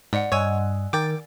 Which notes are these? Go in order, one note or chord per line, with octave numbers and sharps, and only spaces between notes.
G#2 D5 F#5
G2 C#5 D#5 F#5 G#5 E6 G#6
D#3 A#4 G5 D6 A6